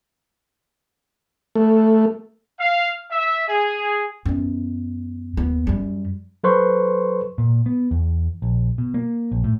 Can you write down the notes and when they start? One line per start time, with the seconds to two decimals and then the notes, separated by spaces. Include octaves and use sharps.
1.55 A3
2.59 F5
3.11 E5
3.48 G#4
4.26 F#2 B3
5.37 D#2 B3
5.67 F#2 G3
6.44 F#3 A4 B4 C5 C6 C#6
7.38 A#2
7.66 B3
7.91 E2
8.42 A#1
8.78 B2
8.94 A#3
9.32 A#1
9.44 A2